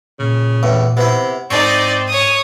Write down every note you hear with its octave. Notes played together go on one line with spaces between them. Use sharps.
A#2 C#3
E2 A2
C3 B3 E4
G#2 C4 D4 D#4 D5 C#6
C#5 D#6